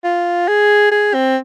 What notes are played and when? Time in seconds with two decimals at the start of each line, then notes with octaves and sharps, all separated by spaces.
0.04 F4
0.48 G#4
0.92 G#4
1.14 C4